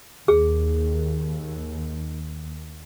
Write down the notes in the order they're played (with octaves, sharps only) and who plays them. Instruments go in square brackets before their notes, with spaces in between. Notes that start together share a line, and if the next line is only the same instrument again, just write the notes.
[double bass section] D#2 [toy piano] G#4